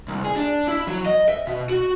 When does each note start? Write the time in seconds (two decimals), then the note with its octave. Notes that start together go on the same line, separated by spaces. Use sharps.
0.08 C2
0.24 G#4
0.36 D4
0.68 E4
0.87 F#3
1.06 D#5
1.28 E5
1.47 B2
1.70 F#4